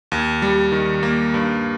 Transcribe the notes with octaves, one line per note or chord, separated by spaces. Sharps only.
D#2
G3
D#3
A#3
G2